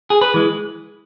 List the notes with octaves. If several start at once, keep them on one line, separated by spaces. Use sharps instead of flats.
G#4
B4
E3 G#3